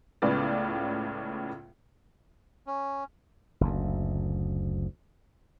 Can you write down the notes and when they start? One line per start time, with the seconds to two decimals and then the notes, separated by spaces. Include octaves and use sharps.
0.22 C#2 A2 C#3 B3 C#4 D5
2.67 C#4
3.61 F#1 D2